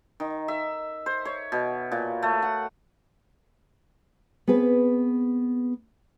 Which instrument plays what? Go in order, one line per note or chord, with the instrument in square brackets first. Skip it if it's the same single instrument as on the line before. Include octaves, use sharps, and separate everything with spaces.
[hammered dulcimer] D#3
E5
C5
C#5
B2
A#2
A3
F#5
[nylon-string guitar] B3 C4 G#4 B4